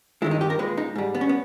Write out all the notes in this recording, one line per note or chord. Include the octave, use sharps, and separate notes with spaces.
G2 D#3 G#3 E4
D#4
G4
A#4
A#2 G#3 B4
D#4
G#2 G3
B3
C#4
B3